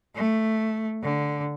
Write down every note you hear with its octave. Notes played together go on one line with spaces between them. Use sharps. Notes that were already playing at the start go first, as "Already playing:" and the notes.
A3
D3